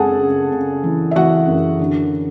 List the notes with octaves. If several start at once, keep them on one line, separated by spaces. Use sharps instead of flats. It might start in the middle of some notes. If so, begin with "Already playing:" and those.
Already playing: F#2 C#3 G#3 G#4 A4 F#5 G#5 A5
C#3
C#3
E3
E5
E3 F#4 F#5
F#2
D3